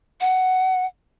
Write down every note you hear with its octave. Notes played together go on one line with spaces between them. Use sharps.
F#5